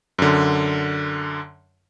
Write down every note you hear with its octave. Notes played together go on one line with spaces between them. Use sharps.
F#2 D3